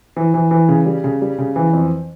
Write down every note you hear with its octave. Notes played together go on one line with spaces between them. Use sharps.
E3
E3
E3
C#3
G3
C#3
G3
C#3
E3
F2